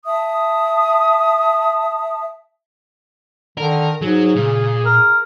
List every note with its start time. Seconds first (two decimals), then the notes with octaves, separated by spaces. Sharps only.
0.06 E5 A5 D#6
3.57 D3 D#3 A#4
4.02 G#2 F#3 G#4
4.35 A#2 C#3
4.85 A#4